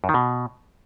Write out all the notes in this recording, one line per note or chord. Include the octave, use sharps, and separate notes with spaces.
F#2
D#3
B2